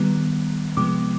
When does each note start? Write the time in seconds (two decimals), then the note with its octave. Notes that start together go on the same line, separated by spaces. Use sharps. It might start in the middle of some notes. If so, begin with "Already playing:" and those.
Already playing: D#3 G3 B3
0.77 C3 F3 G#3 B3 D6